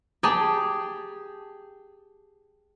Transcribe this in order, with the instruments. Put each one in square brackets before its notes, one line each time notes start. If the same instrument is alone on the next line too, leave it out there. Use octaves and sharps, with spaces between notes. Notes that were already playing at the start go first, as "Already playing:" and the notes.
[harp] G4 G#4 A5